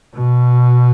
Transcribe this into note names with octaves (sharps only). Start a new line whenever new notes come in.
B2